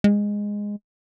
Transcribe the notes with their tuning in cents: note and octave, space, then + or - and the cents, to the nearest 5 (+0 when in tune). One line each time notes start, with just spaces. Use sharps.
G#3 -10